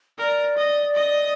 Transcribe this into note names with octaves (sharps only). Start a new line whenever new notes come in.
A#4 D5
D#5
D#5